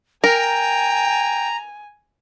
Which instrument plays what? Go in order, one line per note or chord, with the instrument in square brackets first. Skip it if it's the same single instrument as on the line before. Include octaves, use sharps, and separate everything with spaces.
[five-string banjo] A#4 [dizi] G5 [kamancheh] G#5 [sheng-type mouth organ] A#5